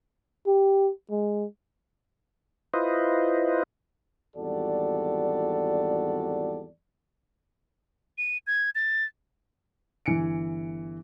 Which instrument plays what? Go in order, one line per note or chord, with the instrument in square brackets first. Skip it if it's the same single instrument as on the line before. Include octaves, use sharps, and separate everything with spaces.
[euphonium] G4
G#3
[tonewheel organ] E4 F4 B4 C5 D#5
[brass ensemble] G#1 E2 G3 F#4 A4 D5
[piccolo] D#7
G#6
A6
[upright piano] G1 E3 G#5 C#7 D7